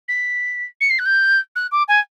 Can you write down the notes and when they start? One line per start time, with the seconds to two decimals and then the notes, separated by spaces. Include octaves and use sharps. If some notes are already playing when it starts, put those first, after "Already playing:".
0.08 B6
0.81 C#7
0.90 C7
0.99 F#6
1.06 G6
1.56 F#6
1.72 D6
1.88 G#5